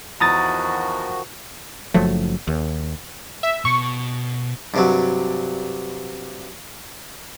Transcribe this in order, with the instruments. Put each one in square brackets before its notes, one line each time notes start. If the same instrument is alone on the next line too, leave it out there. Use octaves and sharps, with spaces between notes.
[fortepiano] E2 [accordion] D#3 F3 F#4 [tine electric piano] A#5 D#6 A6
[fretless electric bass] F#1 F3 F#3 A3
D#2
[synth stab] E5
[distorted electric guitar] B2 [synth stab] C#6
[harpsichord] G2 C3 F#3